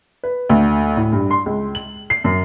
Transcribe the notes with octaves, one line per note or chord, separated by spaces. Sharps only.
B4
D2
A2
G2
C6
C#2
F#7
C7
F#2